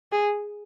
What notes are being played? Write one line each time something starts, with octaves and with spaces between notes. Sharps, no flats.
G#4